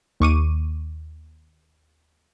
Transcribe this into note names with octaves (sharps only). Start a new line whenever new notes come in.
D#2 C#6 D6 D#7